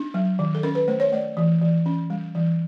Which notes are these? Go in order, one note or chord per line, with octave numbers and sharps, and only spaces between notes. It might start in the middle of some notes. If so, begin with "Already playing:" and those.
Already playing: D4
F#3
D#3
A4
C#4 A#4
B4
A3 C5
C#5
A3 D5
E3
E3
C#4
G3
E3